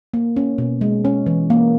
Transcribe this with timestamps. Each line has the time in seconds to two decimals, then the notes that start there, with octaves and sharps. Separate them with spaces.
0.14 A#3
0.37 C#4
0.58 B2
0.81 G#3
1.05 C#4
1.26 E3
1.50 A#3